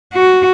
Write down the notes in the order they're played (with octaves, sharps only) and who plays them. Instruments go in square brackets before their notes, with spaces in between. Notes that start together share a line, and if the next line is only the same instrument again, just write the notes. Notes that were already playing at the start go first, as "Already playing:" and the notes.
[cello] F#4